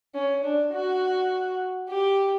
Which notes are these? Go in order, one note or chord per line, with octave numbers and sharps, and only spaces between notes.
C#4
D4
F#4
G4